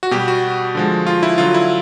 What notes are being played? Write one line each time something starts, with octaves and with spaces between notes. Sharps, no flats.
F#4
B2 G3 G4
F#4
D3 F3 G#3
F4
E4
D3 F#3 F4
E4